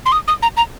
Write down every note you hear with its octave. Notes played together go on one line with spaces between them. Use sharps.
C6
D#6
D#6
A#5
A#5